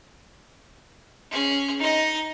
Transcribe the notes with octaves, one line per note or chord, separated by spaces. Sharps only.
C#4 G#4
D#4 D#5